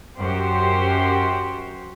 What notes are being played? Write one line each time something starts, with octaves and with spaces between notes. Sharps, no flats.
F#2 F#4 G4 C5